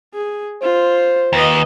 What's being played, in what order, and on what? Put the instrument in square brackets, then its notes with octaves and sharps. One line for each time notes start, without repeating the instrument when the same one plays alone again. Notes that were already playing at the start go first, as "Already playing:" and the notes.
[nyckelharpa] G#4
[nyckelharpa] F4 [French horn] C5
[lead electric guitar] D#2 [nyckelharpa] B4 D#5